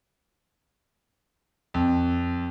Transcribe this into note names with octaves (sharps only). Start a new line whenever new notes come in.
F2